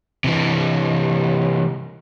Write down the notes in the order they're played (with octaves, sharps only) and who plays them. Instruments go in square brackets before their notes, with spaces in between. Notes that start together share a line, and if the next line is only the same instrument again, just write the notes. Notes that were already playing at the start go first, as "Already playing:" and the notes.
[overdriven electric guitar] C3 E3